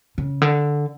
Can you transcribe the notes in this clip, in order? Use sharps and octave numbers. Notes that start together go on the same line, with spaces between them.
C#3
D3